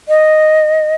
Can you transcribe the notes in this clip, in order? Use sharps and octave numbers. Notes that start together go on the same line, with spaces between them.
D#5